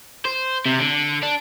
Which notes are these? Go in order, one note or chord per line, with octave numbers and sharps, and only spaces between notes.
C5
C3
D3
D4